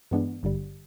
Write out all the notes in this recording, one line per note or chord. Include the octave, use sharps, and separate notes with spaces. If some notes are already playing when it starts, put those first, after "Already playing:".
G2 E3 G#3 B3 D4
G#1 G2 D3 G3